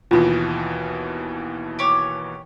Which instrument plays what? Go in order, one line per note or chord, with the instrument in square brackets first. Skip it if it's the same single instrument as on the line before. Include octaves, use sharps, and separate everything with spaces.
[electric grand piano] D#2 B2 E3 [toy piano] F4 B5
[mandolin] G4 C#5